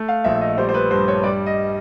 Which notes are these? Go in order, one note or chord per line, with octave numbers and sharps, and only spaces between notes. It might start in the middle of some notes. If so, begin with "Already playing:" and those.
Already playing: A3
F5
A#1 E5
D#5
G3 C5
C5
B4
G2 C5
C#5
G3 D5
D#5